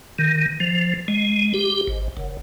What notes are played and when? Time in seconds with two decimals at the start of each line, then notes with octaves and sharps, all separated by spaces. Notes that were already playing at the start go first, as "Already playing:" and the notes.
0.19 D#3
0.60 F3
1.08 G#3
1.54 G4
1.87 G#1
2.17 F#1